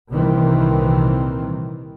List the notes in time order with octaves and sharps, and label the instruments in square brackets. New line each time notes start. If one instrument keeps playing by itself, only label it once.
[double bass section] C2 A#2 D#3 E3 C4